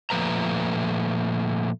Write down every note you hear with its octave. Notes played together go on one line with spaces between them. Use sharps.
A#2 F3 A3 B4 A#5